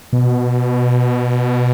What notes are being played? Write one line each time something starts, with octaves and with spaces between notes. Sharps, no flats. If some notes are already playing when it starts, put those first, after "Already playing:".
B2